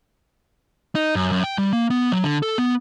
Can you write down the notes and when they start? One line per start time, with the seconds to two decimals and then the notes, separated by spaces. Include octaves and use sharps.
0.95 D#4
1.15 F#2
1.31 F#2
1.44 G5
1.58 G3
1.73 A#3
1.90 B3
2.12 F#3
2.24 D3
2.43 A4
2.58 B3